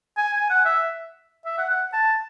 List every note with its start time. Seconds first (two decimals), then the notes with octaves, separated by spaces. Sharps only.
0.17 G#5
0.33 G#5
0.50 F#5
0.65 E5
1.46 E5
1.58 F#5
1.70 F#5
1.93 A5